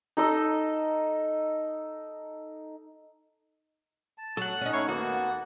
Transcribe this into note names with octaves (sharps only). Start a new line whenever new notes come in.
D#4 A4 D#5
A5
F#3 A4 F#5
C#4 D#4
A3 E4 C#5 F5
D#2 A#3 B3 F#4